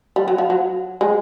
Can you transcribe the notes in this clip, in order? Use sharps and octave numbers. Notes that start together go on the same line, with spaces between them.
G3
F#3
F3
F#3
G#3